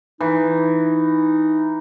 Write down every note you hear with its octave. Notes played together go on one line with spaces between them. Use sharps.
E3 D#4